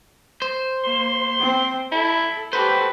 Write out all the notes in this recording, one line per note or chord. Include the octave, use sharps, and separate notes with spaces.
C5
A#3 C6
C4
E4 A4
F#4 G4 A4 B4 C5